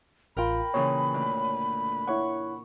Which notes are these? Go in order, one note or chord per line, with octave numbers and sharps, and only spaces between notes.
A1 F4 A#4 G5 B5
A#2 C#3 E3 C#5
D2
E4 C#5 F#5 C#6